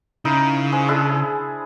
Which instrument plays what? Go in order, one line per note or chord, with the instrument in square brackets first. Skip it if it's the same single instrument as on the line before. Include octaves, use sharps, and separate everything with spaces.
[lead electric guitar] C#3 [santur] D#4 E4 A#4
[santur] G#3 G#4 C5
D4 E4 G#4